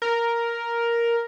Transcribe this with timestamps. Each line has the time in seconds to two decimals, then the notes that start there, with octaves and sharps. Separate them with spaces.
0.02 A#4